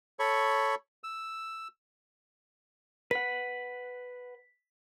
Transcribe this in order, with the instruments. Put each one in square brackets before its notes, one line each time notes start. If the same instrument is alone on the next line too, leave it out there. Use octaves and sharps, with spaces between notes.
[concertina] A4 C#5 B5 C#6
E6
[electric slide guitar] B4 F#5 [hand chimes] B6